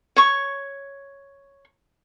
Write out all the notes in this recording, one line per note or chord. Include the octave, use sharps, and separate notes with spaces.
C#5 C#6